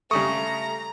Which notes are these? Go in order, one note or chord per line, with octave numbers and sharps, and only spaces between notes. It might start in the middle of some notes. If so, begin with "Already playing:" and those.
C#3 G3 A3 A#5 C#6 D#6